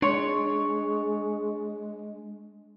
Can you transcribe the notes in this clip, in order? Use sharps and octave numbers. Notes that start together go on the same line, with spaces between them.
G#3 D4 C#5 C6